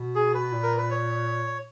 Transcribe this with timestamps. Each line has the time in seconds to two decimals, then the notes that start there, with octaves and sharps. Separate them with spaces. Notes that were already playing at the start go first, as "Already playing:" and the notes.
Already playing: B2
0.15 G#4
0.34 B4
0.53 A#2
0.63 A#4
0.77 B4
0.90 C#5